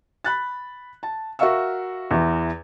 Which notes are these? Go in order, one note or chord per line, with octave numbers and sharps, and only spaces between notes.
B5 F#6 A6
A5
F#4 A#4 E5 F5 C#6 E6
E2 E3